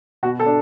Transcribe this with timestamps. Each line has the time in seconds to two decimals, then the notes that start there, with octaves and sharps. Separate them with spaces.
0.23 B2 F#4
0.39 A4
0.46 D4